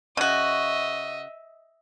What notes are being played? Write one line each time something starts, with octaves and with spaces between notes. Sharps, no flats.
C#3 F#4 D#5 E5